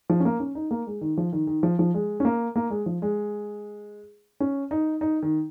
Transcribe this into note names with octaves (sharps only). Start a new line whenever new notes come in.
F3
C#4
A#3
C#4
D#4
A#3
G#3
D#3
F3
D#3
D#3
F3
F3
G#3
C#4
A#3
A#3
G#3
F3
G#3
C#4
D#4
D#4
D#3